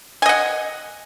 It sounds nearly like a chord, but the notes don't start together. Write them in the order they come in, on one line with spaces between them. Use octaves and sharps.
G#5 D#5 F#5